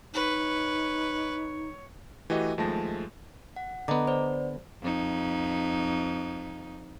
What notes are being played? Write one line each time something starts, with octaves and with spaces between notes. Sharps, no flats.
D#4 B4 C#5
E3 A3 F#4 G4 D#5
D#2 F3 G#3 A3 A5 A#6
F#5
D3 B3 D#5 A#5 D6
C5 D5
F2 D#4